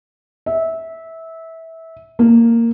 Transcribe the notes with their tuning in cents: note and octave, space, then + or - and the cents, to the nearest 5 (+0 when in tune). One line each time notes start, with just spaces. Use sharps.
E5 -20
A#3 -10